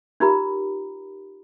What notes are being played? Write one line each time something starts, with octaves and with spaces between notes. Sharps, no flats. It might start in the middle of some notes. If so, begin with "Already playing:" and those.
D#4 F4 G4 A#4 A#5 B5